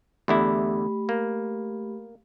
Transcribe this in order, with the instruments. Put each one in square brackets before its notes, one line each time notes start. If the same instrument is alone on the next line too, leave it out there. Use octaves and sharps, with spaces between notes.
[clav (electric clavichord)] E2 D3 E4 [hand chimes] A3 G4 B5
[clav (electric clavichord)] A#3